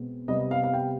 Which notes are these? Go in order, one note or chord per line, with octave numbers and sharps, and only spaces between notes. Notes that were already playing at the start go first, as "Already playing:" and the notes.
Already playing: B2 G#3 C4
C3 G3 B3 D#5
F5
F5
G5